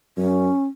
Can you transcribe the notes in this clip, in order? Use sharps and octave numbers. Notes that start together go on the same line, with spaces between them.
F#2 C#4